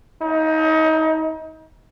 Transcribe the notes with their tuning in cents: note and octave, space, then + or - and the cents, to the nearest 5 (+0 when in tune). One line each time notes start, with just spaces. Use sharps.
D#4 +30